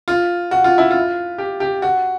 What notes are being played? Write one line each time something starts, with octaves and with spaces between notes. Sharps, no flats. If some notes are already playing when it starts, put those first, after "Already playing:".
F4
F#4
F4
E4
F4
G4
G4
F#4